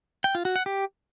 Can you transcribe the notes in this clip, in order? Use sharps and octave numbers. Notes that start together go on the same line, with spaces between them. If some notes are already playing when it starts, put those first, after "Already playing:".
G5
F4
F#4
F#5
G4